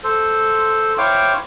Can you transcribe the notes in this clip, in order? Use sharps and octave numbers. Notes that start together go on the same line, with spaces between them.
A4 C5
E4 C5 C#5 F5 G5 D6